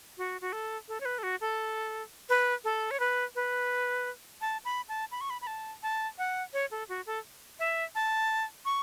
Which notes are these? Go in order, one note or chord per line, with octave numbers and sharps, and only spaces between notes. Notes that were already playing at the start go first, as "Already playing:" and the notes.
F#4
F#4
A4
A4
C#5
B4
A4
F#4
A4
B4
A4
C#5
B4
B4
A5
B5
A5
B5
C#6
B5
B5
A5
A5
F#5
C#5
A4
F#4
A4
E5
A5
C#6